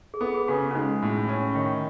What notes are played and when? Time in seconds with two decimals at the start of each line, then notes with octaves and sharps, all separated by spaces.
0.14 G#4
0.21 B3 A4
0.34 G#4
0.48 C#3 F#4
0.71 C#4
0.75 G#3 D#4
1.02 A2
1.29 C#4
1.55 D#3